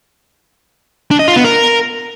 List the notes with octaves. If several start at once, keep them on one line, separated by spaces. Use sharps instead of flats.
D4
D#5
F4
B3
A#4